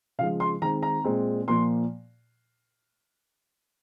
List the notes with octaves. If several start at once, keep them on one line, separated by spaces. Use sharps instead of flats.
C#3 F3 G#3 F5
C6
D#3 G#3 C4 A#5
A#5
A#2 G#3 C4
A#2 F3 A#3 C6